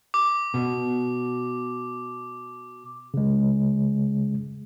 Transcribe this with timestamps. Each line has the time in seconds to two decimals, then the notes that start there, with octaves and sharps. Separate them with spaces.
0.14 D6
0.54 B2
3.14 C#3 G#3